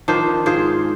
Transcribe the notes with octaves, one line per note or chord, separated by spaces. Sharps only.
D#3 F3 D4 C5
G#2 F4 G#4 C5